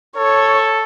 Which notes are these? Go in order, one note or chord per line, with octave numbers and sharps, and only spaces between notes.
A4 C#5